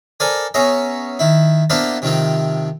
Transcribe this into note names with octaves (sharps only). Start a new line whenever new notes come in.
A4 A#4 C5 D5 G#5
B3 C#4 G#4 E5 A#5
D#3 E4
A#3 B3 D4 E4 F4 C5
C3 D#3 F3 C4